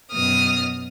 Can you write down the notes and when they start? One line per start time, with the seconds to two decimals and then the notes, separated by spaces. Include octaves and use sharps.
0.12 F#2 B2 D#6 F6